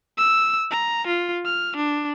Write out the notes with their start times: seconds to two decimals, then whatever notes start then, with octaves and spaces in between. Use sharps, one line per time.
0.17 E6
0.71 A#5
1.07 F4
1.45 F6
1.76 D4